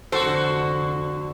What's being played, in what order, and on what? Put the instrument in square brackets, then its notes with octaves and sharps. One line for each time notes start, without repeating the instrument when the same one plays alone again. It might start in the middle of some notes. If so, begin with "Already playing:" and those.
[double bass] F1 D3 [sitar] F#4 A4 [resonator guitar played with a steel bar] C5